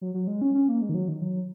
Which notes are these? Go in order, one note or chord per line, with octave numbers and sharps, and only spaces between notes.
F#3
F#3
G#3
C#4
C#4
A#3
G#3
D#3
F#3
D#3
F#3